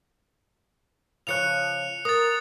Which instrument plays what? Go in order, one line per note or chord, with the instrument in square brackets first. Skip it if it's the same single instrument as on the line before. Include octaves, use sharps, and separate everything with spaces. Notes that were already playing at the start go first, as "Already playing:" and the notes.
[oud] C#3 F3 C#5 [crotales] F#6 C#7 F7
[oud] A#4 [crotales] D#6 A6